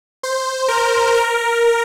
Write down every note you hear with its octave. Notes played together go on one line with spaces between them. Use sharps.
C5
A#4
A#4